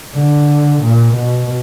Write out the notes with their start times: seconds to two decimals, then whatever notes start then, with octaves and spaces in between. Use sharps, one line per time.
0.14 D3
0.82 A#2
1.14 B2